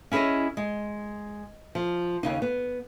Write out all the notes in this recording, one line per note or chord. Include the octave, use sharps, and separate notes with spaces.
C#4 E4 G#4 C#5 D#5
G#3
F3
D#2 C#3 D#4
B3